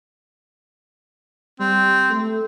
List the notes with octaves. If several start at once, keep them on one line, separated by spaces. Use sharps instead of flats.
G3 C4
A3